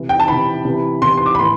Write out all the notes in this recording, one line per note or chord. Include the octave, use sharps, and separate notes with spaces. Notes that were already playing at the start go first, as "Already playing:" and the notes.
Already playing: C3 E3
G5
A5
C3 E3 B5
C3 E3
C3 E3 C6
C6
D6
B5
A2 E3 C6